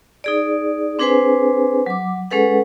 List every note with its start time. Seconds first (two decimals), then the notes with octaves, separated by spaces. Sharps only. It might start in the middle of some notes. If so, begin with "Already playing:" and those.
0.24 D#4 G#4 D5
0.99 C4 D4 G#4 B4 C5 G#5
1.86 F#3 D6
2.31 G#3 C#4 G#4 A4 B4 F#5